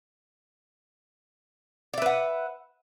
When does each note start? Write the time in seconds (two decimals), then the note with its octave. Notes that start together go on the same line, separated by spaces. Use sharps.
1.94 D5
1.98 E5
2.02 B4
2.06 F#5